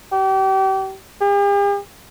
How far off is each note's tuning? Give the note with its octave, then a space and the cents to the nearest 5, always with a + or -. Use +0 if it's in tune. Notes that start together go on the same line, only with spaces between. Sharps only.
G4 -35
G4 +45